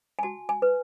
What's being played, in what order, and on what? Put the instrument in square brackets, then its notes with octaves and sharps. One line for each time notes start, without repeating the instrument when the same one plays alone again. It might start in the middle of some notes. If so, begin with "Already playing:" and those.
[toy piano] G#5
F#4 A5
G#5
B4